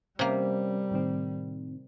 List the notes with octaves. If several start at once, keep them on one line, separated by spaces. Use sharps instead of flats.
C3 G3 A#3 C#4
A2 D#3 C4